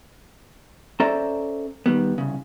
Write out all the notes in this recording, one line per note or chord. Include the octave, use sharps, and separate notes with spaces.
C#4 A4 C5 D5 E5 A#5
D#3 G3 B3
C2 C#3